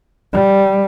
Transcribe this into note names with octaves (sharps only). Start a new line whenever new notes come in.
G3